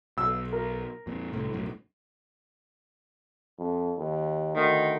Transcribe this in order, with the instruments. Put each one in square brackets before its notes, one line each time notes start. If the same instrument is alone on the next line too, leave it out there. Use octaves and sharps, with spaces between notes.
[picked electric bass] B1 [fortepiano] E6
[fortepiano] A#4
[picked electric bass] F2 A#2
C2 A2 A3
B1 F#2 A2
[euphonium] F2
D#2
[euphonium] D2 [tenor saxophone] D#3